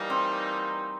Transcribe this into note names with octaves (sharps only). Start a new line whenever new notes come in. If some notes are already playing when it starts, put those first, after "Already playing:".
Already playing: E3 G3 A#3 D#4
C4